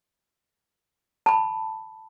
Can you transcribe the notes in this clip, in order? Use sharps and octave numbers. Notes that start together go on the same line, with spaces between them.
A5 B5